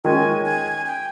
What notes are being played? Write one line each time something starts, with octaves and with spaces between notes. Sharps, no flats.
D#3 G#3 C#4 G#5
G#5
G5